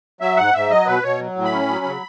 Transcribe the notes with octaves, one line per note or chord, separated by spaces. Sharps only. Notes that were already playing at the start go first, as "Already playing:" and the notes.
F#3 E5
G#2 F#5
G#2 E5
F#3 D#5
B2 B4
B2 C#5
F#3
A2
B5
C#4
F#3
C#3